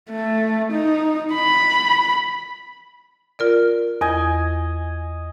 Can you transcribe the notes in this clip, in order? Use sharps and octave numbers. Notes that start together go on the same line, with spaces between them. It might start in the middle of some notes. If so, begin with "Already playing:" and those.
A3
D#4
B5
F4 A#4 D5
E2 D#5 G#5